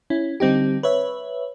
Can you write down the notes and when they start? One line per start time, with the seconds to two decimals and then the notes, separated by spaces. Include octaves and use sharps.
0.10 C#4 E4
0.40 D3 G3 C4 D#4 G4
0.83 B4 C#5 E5